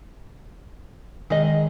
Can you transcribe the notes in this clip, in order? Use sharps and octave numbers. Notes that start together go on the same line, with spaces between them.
D#3 G#3 D#4 G#4 D#5